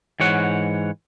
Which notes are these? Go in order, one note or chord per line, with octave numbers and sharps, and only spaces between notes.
G#2 E3 C#5 F#5